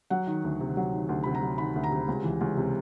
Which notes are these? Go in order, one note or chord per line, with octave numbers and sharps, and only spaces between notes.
F#3 F#5
D#3
D2
C3
F#3
D#3
D2
C3 B5
A#5
F#3
D#3 B5
D2
A#5
C3
C#2
E3
C#2
C3